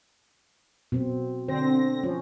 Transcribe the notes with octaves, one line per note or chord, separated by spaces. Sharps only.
B2 C4
D3 C4 C5 A#6
F3 C#4